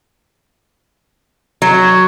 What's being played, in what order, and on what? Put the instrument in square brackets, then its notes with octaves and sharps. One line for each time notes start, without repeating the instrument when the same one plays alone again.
[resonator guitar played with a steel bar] F#3